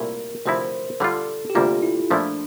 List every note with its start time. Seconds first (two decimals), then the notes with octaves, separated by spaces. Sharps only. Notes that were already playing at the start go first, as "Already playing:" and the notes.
Already playing: C2 A#2 A3 E4 A#4
0.46 D2 C3 F3 C4 E4 C5
1.00 D3 G3 D4 F4 A4
1.50 G4
1.55 D2 C3 G3 A#3 F4
1.82 E4
2.10 A#2 F3 A3 D4 E4